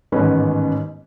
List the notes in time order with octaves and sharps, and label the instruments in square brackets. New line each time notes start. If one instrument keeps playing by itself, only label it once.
[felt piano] A1 G#2 D#3 B3 C#4 B4